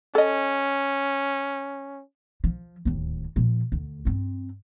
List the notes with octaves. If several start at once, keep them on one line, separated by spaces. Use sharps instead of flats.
C#4 A4 D#5
F3
D1 D#2
A#2 F3
D2
G2 C4